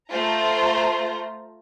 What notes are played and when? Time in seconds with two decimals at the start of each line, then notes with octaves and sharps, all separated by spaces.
0.11 A3 F4 C5 A#5